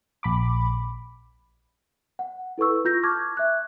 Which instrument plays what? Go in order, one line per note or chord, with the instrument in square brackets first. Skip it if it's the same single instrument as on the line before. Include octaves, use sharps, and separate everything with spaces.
[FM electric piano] A#1 B5 D6
[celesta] F#5
E4 A4 B4 C#6 E6
F4 G6 A#6
A5 C#6 D6 F6 G#6
E5 F#6